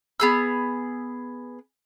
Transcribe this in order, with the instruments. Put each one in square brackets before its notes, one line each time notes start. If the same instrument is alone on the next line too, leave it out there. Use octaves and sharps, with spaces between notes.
[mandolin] B3 G#4 E6